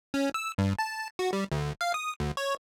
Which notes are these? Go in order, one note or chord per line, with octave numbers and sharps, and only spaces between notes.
C#4
E6
G2
A5
F#4
G3
D2
F5
D#6
D2
C#5